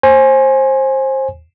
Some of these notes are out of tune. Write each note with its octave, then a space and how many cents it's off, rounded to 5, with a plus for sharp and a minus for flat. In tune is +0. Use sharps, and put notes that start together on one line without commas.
C5 +25 G#5 +0